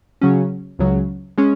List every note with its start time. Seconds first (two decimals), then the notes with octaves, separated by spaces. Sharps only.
0.21 C#3 F#3 C#4
0.79 C#2 C#3 F#3
1.38 G#3 C#4